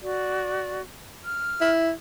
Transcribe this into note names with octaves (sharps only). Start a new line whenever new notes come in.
F#4 D5
F6
E4